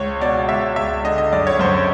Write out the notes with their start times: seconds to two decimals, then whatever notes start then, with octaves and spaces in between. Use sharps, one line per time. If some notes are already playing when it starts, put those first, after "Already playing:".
Already playing: C#2 C#5
0.20 B2 D5
0.49 C#2 E5
0.76 C#2 E5
1.04 D3 D#5
1.18 D#5
1.33 F#2 D5
1.47 C#5
1.59 F#2 C5